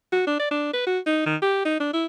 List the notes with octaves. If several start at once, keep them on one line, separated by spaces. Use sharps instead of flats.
F#4
D4
D5
D4
B4
F#4
D#4
D#3
G4
D#4
D4
E4